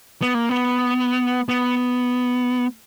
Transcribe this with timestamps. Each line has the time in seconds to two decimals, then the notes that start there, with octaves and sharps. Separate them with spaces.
0.22 B3
0.35 A#3
0.49 B3
1.49 B3